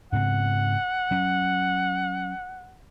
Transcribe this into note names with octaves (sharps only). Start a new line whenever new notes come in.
G#2 C#3 C4 F#5
F#3 C#4